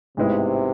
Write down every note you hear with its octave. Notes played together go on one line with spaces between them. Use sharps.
A1 G#2 C3 G#3 B3 E4